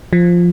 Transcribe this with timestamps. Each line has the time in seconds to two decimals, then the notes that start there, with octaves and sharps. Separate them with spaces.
0.13 F3